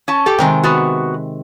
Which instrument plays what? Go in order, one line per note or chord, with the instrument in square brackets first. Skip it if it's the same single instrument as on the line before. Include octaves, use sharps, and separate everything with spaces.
[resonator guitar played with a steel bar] C#4 A5
G4 A4
[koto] C3 D#3 G#3 [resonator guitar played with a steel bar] G5
[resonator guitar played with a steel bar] B3 F#4